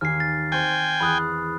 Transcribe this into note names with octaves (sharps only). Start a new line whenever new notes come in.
D#2 G#5 F6 C7
A6
C4 G5 G#5 C#6 D7
E2 B5 D#6 F#6